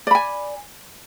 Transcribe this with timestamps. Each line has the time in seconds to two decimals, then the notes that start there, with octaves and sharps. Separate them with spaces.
0.07 D5
0.11 B5
0.15 G#5